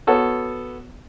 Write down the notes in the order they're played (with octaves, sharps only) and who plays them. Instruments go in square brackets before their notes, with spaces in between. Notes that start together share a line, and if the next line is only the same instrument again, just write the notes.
[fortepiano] B3 F#4 A4 C#5